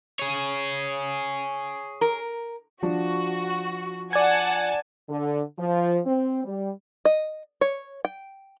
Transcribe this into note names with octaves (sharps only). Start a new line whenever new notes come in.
G#4 C#5
A#4
F3 D4 F#4
D5 F#5 G#5 A5 G#6
D3
F3
C4
G3
D#5
C#5
G5